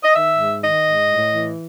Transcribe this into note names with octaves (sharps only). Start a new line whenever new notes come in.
D#5
D#3 E5
G#2
D#3 D#5
G#2
A2
E3